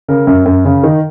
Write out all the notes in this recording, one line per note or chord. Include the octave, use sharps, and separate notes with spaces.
C#3 A#4
F#2
F#2
C#3
D#3